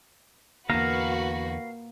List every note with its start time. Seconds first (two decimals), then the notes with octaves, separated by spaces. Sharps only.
0.70 E2 D3 A#3 F#4 B4 F5 A#5